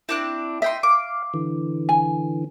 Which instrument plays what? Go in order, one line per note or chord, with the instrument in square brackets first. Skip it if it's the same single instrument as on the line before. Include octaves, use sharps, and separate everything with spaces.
[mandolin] C4 D4 F#6 [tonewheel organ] E4
[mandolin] D#5 G5 C6 [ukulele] E5
[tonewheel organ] F5 [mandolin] D6
[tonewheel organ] D3 E3
[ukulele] G#5